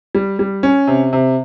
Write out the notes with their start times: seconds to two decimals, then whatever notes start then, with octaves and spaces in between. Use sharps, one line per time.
0.15 G3
0.39 G3
0.63 C#4
0.87 C3
1.13 C3